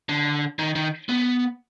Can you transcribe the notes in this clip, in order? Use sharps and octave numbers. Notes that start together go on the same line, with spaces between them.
D3
D#3
D#3
B3